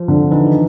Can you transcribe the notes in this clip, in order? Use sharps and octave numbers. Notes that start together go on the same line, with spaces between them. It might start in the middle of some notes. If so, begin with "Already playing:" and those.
Already playing: F3
D3
E3 D#4
D#3